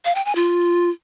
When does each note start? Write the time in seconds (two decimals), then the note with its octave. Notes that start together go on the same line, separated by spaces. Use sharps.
0.05 F5
0.15 G5
0.25 G#5
0.36 F4